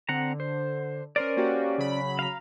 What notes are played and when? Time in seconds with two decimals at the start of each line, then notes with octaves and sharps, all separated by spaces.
0.09 D3 C4 F#5 A#5
0.40 C5
1.16 C#4 A#4 C5 D5
1.37 A#3 F#4 G4
1.78 C#3 F#3 B5
2.19 F5 A#5